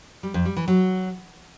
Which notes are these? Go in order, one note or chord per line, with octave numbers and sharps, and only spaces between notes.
G3
F2
G3
E3
F#3